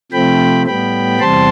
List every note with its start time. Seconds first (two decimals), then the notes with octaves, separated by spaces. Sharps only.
0.12 C3 F3 A3 C4 G5 B5
0.66 A2 G3 B3 G5 B5
1.20 E2 C3 G3 C4 A5 C6